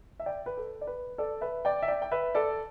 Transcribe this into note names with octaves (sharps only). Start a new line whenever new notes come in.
E5
D5 G5
B4
A4
D5
B4
A4 D5
B4 E5
D5 G5
E5
D5 G5
G5
B4 E5
A4 D5